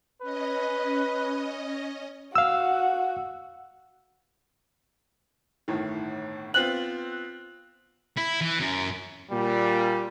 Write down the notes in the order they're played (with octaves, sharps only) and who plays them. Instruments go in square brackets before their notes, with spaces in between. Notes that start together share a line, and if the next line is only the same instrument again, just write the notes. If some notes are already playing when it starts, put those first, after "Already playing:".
[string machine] C#4 D#5 [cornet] B4
[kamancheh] F#4 [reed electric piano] F5 E6
[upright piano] G1 A2 D#3
[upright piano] B3 C4 F4 [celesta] F#6 F#7
[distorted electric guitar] E4
E3
F#2
[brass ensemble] A#2 G3